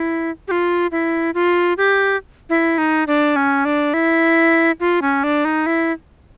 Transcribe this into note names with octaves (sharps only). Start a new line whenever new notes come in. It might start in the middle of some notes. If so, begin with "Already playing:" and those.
Already playing: E4
G4
F4
E4
F4
G4
E4
D#4
D4
C#4
D4
E4
F4
C#4
D4
D#4
E4